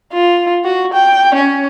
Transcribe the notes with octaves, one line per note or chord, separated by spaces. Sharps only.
F4
F#4
G5
C#4